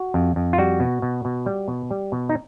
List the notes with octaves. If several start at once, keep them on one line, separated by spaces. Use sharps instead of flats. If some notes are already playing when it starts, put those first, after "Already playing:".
Already playing: F#4
F2
F2
F4
G3 F#4
B2
B2
B2
G3
B2
G3
B2
D#4